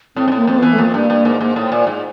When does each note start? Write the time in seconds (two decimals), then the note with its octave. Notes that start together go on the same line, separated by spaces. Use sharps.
0.16 A2 C4
0.28 G#2
0.32 A2
0.37 A#3
0.47 F2 C4
0.58 E3 B3
0.73 A3
0.78 F2 A#3
0.94 G2
1.10 G2
1.25 G#2
1.41 G#2
1.56 A2
1.72 A#2
1.87 G#2